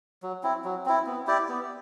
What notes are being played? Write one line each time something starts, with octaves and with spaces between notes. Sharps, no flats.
F#3
C4 E4
F#3
C4 E4
B3
E4 G4 D5
B3